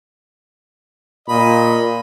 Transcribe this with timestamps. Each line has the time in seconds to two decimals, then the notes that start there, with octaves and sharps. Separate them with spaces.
1.28 A#2 D#5 B5